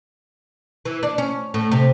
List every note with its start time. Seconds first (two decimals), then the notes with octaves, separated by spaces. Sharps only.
0.85 E3
1.03 D4
1.18 C#4
1.54 A2
1.72 C3